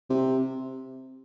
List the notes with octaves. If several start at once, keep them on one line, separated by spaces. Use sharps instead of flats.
C3